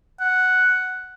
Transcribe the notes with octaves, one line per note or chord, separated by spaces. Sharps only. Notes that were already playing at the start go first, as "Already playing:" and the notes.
F#5